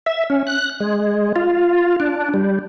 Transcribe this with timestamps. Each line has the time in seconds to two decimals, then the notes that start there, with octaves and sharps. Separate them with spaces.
0.06 E5
0.30 C#4
0.47 F#6
0.80 G#3
1.36 F4
2.00 D4
2.34 G3